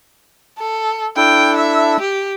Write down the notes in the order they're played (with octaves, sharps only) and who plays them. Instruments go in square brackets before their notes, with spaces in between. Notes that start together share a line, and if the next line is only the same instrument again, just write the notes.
[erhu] A4
[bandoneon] D4 E4 A4 [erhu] G5
[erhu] E5
G4